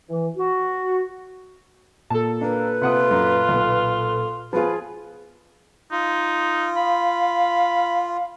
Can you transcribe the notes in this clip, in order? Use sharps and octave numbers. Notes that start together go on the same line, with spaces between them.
E3
F#4
A#2 A4 A5
A#3 D4 B4
C3 F4 F#5 D#6
F#2
B1 B3
F3 B3 F4 G#4 B4
D#4 F4
F5 B5